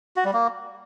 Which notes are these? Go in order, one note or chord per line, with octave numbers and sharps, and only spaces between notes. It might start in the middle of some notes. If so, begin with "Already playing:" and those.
F#4
G3
A#3